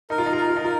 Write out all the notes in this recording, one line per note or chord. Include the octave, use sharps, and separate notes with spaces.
D#4 A#4
F4
D#4
F4
D#4 A#4
F4
D#4
F4 A#4